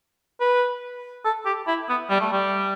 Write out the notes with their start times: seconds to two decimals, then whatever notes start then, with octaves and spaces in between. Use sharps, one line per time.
0.40 B4
1.25 A4
1.46 G4
1.68 E4
1.89 B3
2.10 G3
2.21 A3
2.33 G3